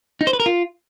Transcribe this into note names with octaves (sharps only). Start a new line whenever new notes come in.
D#4
C5
B4
A#4
F4